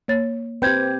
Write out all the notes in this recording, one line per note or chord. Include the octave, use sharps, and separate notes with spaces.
A#3 C#5 A6
C4 G4 B4 C5 G5 G6 G#6